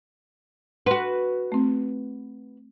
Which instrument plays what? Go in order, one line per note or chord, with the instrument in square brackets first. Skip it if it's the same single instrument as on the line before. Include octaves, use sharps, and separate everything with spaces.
[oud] F#4 B4 [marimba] F#5 C6
[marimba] A3 C4